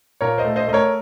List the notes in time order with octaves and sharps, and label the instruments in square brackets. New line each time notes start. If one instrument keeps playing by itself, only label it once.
[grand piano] A#2 A#4 C#5
C5 D#5
A3
C5 D#5
A3 D#5
A#4 C#5